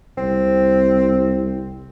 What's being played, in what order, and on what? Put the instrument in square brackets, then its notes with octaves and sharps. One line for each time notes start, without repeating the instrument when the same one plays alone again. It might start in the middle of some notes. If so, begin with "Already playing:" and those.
[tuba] C2 [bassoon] C4